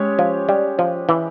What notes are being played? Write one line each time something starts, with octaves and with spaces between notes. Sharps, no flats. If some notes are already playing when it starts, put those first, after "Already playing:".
Already playing: G#3 C#4 G4 C#5
F3
G3
F3
E3